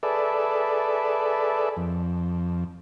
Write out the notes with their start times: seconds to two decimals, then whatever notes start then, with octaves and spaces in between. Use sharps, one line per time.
0.03 G#4 A4 B4 D5 E5
1.77 F2